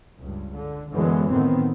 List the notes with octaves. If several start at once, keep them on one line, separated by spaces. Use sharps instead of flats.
C#2 G2
D3
F#2 D3 E3 F#3 G#3 B3
A2 D#3 B3 C4